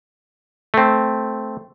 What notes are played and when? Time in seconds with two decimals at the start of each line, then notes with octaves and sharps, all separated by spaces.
0.74 A3 C4